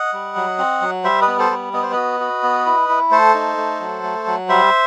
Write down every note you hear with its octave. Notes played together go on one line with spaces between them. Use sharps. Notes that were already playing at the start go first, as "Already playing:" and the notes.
Already playing: D#5 F#5
G3
F#3
C4
F#3
G3 C5 E5
B4 D#5
B3
A4 C5
G3
B3 D#5
C5
F#4 B4 D#5
F#4
B3
E4
E4
A3 A4 C5
D#4
A3
F#3
A3
F#3
G3 C5 E5